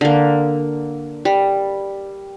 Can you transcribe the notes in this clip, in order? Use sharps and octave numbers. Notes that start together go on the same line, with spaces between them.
D3 A#3
G3